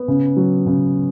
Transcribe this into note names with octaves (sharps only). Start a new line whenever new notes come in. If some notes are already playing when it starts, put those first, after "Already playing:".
Already playing: B3
C#3
F#3
C#3